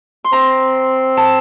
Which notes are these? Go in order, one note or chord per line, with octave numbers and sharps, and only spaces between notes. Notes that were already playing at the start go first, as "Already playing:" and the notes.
C6
C4 A#5
A5